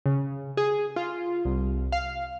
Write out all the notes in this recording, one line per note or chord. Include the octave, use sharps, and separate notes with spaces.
C#3
G#4
F4
C2
F5